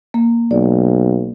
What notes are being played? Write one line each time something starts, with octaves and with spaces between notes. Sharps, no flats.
A#3
B1 D5